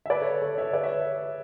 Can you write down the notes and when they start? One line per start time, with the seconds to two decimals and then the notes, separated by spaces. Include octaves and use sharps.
0.06 E5
0.10 B4 D5
0.21 A4 C#5
0.42 A4 C#5
0.58 C#5 E5
0.73 B4 D5
0.83 C#5 E5